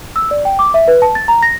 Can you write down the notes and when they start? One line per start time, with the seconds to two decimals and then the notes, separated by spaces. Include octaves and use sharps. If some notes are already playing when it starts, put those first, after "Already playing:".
0.16 E6
0.31 D5
0.45 G5
0.59 D6
0.74 E5
0.88 B4
1.02 A5
1.15 A6
1.28 A#5
1.43 A#6